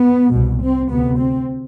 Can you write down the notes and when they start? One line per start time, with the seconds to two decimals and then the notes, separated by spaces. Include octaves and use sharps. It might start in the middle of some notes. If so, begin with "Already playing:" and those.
Already playing: B3
0.33 C2 B2
0.62 C4
0.90 D2 C3 B3
1.18 C4